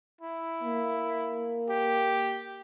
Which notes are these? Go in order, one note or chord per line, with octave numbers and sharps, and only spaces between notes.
E4
A#3
G4